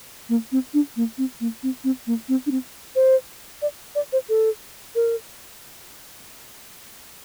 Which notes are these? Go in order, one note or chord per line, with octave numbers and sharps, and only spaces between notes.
A#3
C4
D4
A#3
C4
A#3
C4
C4
A#3
C4
D4
C4
C5
D5
D5
C5
A4
A#4